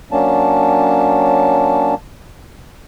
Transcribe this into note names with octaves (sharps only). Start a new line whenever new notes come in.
F#3 A#3 C#4 D4 A5